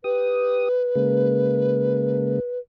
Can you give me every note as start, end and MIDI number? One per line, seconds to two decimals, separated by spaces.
0.04 0.69 67
0.04 2.59 71
0.04 0.69 87
0.95 2.40 49
0.95 2.40 56
0.95 2.40 58